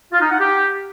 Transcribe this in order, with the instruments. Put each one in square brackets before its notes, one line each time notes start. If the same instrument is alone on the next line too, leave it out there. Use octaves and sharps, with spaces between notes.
[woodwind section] F4
D#4
F#5
G4